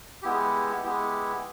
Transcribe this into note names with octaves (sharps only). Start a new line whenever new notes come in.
G#3 B3 E4 G4
G#3 B3 E4 G4